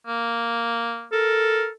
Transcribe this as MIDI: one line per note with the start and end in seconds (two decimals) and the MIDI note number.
0.07 1.07 58
1.12 1.72 69
1.12 1.67 70